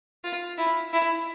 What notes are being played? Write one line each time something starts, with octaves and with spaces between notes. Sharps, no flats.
F4
E4
E4